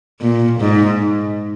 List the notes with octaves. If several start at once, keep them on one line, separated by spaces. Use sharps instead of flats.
A#2
G#2